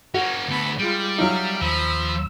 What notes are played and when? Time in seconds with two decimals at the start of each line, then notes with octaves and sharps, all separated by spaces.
0.14 A#3 C#4 F#4
0.48 D2 B3 A4 B5
0.79 G3 G#3 F4
1.18 F#3 D#4 E5 F5
1.61 D#2 F3 B5 E6